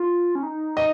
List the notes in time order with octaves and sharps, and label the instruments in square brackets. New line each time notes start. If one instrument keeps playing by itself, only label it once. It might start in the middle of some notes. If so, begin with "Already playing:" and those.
Already playing: [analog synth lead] F4
C#4
D#4
[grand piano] D#5